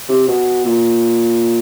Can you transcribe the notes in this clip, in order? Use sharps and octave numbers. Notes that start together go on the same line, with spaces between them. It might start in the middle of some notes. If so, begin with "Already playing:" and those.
C3
B2
A#2